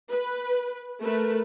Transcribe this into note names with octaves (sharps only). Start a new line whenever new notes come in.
B4
A3 A#4 B4